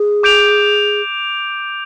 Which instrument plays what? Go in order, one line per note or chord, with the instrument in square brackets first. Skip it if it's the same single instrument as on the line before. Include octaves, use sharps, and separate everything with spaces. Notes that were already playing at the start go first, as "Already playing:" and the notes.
Already playing: [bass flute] G#4
[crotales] D6 G6 D7 F7